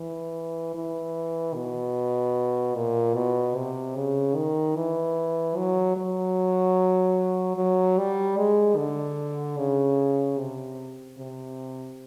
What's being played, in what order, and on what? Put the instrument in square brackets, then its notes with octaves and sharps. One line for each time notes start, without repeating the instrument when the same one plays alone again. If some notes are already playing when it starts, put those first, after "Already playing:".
Already playing: [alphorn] E3
E3
B2
A#2
B2
C3
C#3
D#3
E3
F#3
F#3
F#3
G3
G#3
D3
C#3
C3
C3